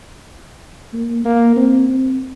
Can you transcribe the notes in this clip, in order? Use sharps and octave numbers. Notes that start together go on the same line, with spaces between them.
A#3
A#3
C4
C4